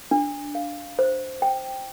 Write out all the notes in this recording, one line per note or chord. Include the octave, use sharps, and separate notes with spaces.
D4
F5
C5
G5